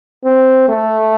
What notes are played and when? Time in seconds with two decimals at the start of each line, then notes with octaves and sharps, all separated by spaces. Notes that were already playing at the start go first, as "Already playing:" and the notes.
0.24 C4
0.69 A3